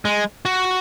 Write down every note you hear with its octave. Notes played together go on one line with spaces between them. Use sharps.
G#3
F#4